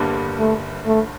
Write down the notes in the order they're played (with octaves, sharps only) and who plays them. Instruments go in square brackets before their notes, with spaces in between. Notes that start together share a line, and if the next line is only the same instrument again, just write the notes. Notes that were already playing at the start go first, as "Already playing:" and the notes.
Already playing: [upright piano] G1 G2 D3 G3 A#3
[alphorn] A3
A3